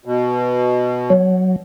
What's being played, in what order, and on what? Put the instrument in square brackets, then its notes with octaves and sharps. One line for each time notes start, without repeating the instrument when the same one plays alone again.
[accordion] B2
[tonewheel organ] F#3